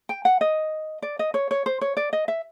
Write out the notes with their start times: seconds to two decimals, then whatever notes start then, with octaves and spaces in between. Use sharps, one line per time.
0.09 G5
0.25 F#5
0.41 D#5
1.02 D5
1.19 D#5
1.34 C#5
1.51 C#5
1.66 C5
1.81 C#5
1.97 D5
2.13 D#5
2.28 E5